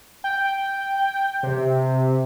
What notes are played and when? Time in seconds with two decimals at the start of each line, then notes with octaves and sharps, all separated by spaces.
0.24 G5
1.43 C3